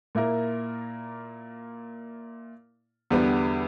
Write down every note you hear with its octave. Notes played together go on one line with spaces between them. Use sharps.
A#2 A#3 E4 A#4
E2 D3 G3 B3